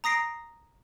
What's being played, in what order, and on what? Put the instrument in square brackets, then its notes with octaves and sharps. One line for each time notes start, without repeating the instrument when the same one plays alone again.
[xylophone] A#5 D#6 A#6 C7 D7